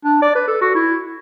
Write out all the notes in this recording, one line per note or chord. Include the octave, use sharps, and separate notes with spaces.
D4
D5
B4
A4
F#4
E4